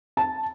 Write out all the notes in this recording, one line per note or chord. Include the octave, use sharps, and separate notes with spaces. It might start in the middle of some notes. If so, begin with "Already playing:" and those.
A5